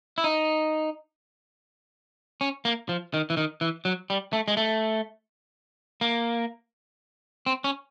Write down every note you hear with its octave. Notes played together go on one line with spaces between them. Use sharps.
E4
D#4
C#4
A#3
F3
D#3
E3
D#3
E3
F#3
G3
A3
G#3
A3
A#3
C4
C#4